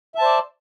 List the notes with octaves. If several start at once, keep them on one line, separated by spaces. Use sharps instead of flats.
C5 D5 E5 A5